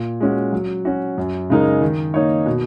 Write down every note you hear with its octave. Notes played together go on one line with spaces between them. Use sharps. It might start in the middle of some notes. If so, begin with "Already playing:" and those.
Already playing: A#2
G#3 C#4 F#4
F#3
C#4 F#4
F#2
C#3 G#3 D#4 A#4
D#3
A#3 D#4 A#4 C#5
B2